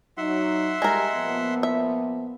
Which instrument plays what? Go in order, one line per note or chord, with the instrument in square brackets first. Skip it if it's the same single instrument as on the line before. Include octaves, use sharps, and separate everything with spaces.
[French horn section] F#3 D#4 [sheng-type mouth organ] E5 F#5 C6
[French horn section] G3 [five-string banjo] G#3 A#4
[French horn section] A#2 F3 B3
[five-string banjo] E5